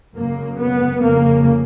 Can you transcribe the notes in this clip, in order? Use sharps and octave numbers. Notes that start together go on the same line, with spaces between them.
F#2 C#3 A#3
B3
F2 C#3 A#3